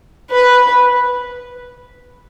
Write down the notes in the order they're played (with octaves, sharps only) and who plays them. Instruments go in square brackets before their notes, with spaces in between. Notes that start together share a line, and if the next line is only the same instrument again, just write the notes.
[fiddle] B4